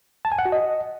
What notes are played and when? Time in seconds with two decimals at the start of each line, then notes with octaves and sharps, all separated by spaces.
0.25 A5
0.32 G#5
0.39 F#5
0.45 F#4
0.52 D#5